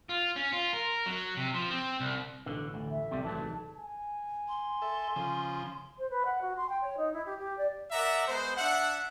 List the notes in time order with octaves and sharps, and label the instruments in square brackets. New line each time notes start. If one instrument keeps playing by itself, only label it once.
[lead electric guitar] F4
C#4
F4
A#4
F#3
C3
F3
C4
C2
[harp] A1 B2 [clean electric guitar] D3
[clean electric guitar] D2
[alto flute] E5
[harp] C2 [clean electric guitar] C3 G3
[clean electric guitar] E3 F#3 A3 [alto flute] A5
[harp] D#4 G#4
[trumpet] G#5
[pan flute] C6
[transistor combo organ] A4 E5
C#3 F3
[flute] C5
B4
F#5
F#4
C6
G5
C#5
D#4
E4
G4
G4
D5
[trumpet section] A#4 D5 E5 F#5 A#5
G#3 B3 C5
D4 E5 F#5